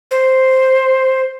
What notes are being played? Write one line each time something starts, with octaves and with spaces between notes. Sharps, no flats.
C5